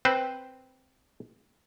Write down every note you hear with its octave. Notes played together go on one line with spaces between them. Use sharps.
C4 B4 C5